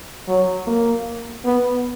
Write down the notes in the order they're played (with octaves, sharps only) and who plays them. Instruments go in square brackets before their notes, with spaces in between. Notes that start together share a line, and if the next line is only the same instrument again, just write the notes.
[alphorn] F#3
A#3
B3